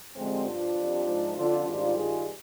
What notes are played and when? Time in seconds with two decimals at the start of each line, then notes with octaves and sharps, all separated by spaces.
0.15 F2 D3 G3 G#3 C4
0.45 G2 F3 D4 F4
0.75 F2 C3 G3
1.04 G#2 F3
1.34 F2 D3 F3 D4 F4
1.64 G#2 D#3 G3 D4 F4
1.94 G2 D#3 G3 F4 G#4